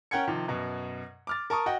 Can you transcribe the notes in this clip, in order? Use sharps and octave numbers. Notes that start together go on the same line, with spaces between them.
C#4 A#4 F#5 G5 G#6 C#7
C3 D#3 F3
F#2 B2
D6 F6 A6
A#4 A5 C#6 D#6
F#4 D#5 F#5 G5